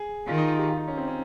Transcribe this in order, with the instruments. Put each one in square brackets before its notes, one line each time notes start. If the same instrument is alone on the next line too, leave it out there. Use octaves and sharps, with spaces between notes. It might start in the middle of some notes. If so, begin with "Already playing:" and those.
Already playing: [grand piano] G#4
[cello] D#3 [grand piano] F4
[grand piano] D#4
F4
G4
F4
D#4
C#4
C4
C#4